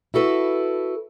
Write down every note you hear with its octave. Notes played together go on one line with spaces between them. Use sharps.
E4 F#4 A4 B4